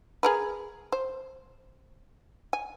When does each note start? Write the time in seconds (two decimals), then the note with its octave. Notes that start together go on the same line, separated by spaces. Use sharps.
0.23 G#4 A#4 B4
0.92 C5
2.53 G#5